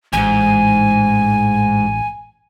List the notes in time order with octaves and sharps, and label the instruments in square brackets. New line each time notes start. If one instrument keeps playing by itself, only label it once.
[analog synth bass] A1 [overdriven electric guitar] F2 G#2 [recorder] G#5